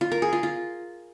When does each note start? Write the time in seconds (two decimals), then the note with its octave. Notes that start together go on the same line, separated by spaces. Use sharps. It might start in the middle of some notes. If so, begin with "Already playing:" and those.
0.01 F4
0.12 A#4
0.22 G#4
0.33 F4
0.43 F4